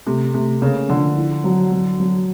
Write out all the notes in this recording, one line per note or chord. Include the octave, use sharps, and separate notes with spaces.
C3 A3
C3 A3
C#3 A#3
D3 F3
E4
F#3
F#3
F#3